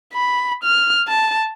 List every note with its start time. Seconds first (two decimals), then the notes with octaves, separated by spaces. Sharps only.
0.14 B5
0.64 F6
1.08 A5